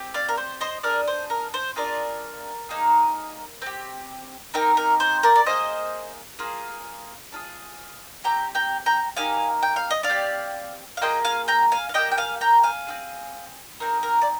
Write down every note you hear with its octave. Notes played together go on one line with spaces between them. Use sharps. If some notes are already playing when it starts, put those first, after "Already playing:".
Already playing: C4 G4
D5 F5
A#4
C5
C5 D#5
D4 G#4 A#4 D5
C5
A#4
C5
D4 F4 G#4 A#4 D5
A#3 D#4 G#4
C4 G4
C4 D#4 G4 A#4
A#4
C5
A#4 D5
D5
A#3 D4 G#4 C5 D#5
A#3 F4 G#4
D4 F4 G#4
C4 G4 G5 A#5
G5 A#5
G5 A#5
A#3 D#4 G4 F5 G#5
G5
F5
D#5
D5 F5
C4 G4
F5
A#3 F4 G#4 D#5 G5
F5 G#5
G5 A#5
F5 G#5
F5
A#3 D#4 G4 D#5 G5
G5
F5 G#5
G5 A#5
F5 G#5
C4 F4 G#4
C4 D#4 G#4 A#4
A#4
D5